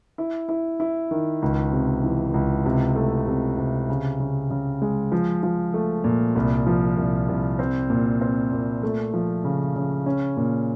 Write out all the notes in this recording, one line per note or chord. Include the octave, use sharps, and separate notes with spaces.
E4
E4
E4
D#3
C#2
C3
E3
C#2
C3
A3
C3
C3
C#3
C#3
C#3
G#3
F3
F3
A3
A#2
C2
F3
C2
C2
C4
A#2
C4
A#2
A3
F3
C#3
C#3
C#4
A#2